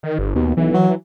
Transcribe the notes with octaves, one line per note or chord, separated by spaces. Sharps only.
D#3
G1
D#2 B2
B1 E3
F#3